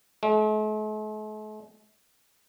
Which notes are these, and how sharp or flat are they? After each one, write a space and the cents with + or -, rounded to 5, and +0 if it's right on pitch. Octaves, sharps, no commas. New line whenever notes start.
A3 -45